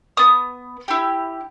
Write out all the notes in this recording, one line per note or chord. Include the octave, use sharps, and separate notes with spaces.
B3 D#6
E4 G4